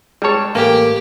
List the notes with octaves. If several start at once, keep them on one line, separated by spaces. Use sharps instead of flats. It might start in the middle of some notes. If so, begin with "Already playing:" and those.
G3 G#3 C#5 A5
A1 A#3 G4